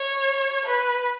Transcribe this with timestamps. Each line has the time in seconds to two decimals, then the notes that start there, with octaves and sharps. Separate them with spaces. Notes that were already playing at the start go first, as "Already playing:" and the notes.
Already playing: C#5
0.65 B4